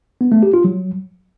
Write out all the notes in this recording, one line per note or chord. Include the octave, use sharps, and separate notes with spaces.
B3
A3
G4
F4
F#3